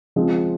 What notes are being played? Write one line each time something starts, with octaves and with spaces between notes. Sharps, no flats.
C#3 F3 G#3 C4